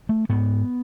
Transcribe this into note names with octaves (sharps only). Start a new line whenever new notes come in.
A3
G#2 B3